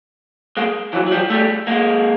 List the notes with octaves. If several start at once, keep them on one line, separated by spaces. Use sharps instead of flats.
G#3 A#3
E3 F#3
F#3
F3 G3
G3 A3
G#3 A#3